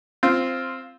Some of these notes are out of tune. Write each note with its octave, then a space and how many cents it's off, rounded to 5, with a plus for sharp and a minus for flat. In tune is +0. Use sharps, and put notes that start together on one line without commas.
C4 +0 F4 -5